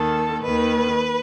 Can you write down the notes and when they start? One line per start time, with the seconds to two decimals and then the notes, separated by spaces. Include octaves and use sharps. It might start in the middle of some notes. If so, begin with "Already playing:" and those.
Already playing: D#2 D#3 A4
0.42 D#2 D#3 B4